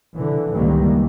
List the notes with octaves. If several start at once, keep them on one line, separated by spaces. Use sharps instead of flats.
D3 E3
C#2 G2 D#3 E3 G3 A#3